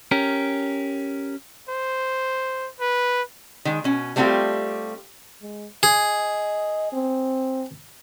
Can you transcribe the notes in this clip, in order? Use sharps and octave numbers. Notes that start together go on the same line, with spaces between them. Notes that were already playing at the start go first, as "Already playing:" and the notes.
C#4 G4 A#4
C5
B4
D#3 G#3
B2 C#4
G3 A3 B3 C4 F4 G4
G#3
G#4 D#5
C4